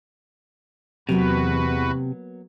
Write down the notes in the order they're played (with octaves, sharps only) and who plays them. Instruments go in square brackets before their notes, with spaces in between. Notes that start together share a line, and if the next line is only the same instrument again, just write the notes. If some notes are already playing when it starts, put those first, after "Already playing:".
[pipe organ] E2 F#4 B4 [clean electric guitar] C3 [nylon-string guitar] F#3 A#3 B3